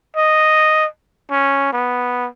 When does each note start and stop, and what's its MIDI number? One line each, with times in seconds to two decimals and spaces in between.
0.16 0.87 75
1.31 1.70 61
1.73 2.27 59